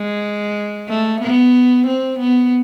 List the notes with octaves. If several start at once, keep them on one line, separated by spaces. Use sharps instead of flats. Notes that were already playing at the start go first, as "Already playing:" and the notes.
Already playing: G#3
A3
B3
C4
B3